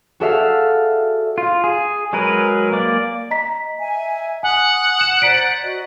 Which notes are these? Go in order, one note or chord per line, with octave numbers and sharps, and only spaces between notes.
F#4 G#4 A4 D5 E5 F5
F4
G#4
F#3 G#3 G#4 A#4 B4
A#3 D5
D#5 A#5 B6
E5 G#5
F#5 G#5 D#6
E7
C5 D5 A#5 B6 D7
F#4 D#5